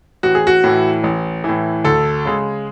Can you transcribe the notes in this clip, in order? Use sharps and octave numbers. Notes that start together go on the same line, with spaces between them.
A1 F#4
G#4
F#4
A2 E3
A1
A2 E3
D2 A4
C#3 G#3